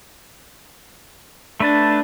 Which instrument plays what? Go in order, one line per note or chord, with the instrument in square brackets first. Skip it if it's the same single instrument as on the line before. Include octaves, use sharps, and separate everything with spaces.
[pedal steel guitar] A3 B4 A5 [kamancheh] D4